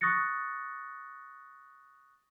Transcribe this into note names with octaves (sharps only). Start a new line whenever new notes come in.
C#6 D#6 F#6 A6 A#6 C#7